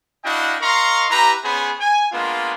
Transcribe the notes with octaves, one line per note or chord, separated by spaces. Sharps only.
D4 E4 F#4 D#5 F5 G5
A#4 D#5 F5 A#5 C6 C#6
E4 G4 B4 A#5
B3 C#4 G#4 C5 B5
G#5
G#3 A#3 B3 D4 F4